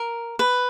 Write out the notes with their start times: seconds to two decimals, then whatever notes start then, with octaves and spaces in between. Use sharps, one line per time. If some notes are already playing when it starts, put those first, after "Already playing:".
Already playing: A#4
0.39 B4